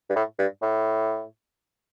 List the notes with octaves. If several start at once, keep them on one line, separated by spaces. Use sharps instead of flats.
G2
A2
G2
A2